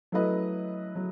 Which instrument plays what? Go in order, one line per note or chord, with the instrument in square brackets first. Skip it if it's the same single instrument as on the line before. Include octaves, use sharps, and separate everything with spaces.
[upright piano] F#3 A3 E4 B4 D#5
F#3